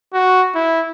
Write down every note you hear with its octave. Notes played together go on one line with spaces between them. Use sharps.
F#4
E4